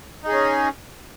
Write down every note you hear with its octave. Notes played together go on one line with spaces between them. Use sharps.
C#4 D#4 G#4